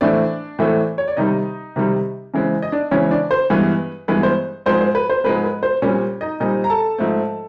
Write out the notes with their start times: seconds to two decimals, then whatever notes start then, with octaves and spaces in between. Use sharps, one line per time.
0.01 A2 E3 A3 C4 D4 D5
0.59 A2 E3 A3 C4
0.98 C#5
1.08 D5
1.17 C3 D#3 G3 D#4 D#5
1.76 C3 D#3 G3
2.34 C#3 E3 G#3 C4
2.62 D#5
2.72 D4 D5
2.91 C#3 E3 G#3 C4 C#4 C#5
3.11 D4 D5
3.31 C5
3.50 G2 E3 G#3 B3 B4
4.08 G2 E3 G#3 B3 B4
4.23 C5
4.66 G#2 F3 G#3 C4 C5
4.81 C5
4.95 B4
5.10 C5
5.24 G#2 F3 G#3 C4 B4
5.44 B4
5.63 C5
5.82 A#2 G3 C4 C#4 C#5
6.21 D#4 D#5
6.40 A#2 G3 C4 D#4 D#5
6.64 A#5
6.70 A4 A5
6.98 G#2 F3 A3 C4